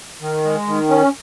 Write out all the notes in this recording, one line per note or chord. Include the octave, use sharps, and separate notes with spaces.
D#3
G#3
D#3
C#4